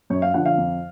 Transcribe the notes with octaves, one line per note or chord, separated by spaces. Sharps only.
F#2 C#5
F5
D3 F3 F#5
F5
F2